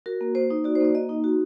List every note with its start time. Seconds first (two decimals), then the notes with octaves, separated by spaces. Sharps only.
0.06 F#4 A#4
0.21 A#3
0.35 A#3 C5
0.50 D#4
0.64 F#4 D5
0.75 C5
0.80 A#3 D5
0.95 A#3 D#5
1.09 D#4
1.24 F#4